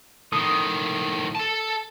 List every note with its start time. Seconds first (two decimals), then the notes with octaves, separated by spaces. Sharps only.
0.32 A2 D#3 D#6
1.35 A4 A5